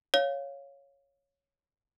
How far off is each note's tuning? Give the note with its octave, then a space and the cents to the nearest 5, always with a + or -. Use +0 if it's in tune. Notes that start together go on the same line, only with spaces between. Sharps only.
C#5 +0 F5 +0